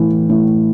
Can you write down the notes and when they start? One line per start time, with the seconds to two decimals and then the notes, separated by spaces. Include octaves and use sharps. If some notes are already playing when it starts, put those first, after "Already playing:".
Already playing: A2 E3
0.30 A2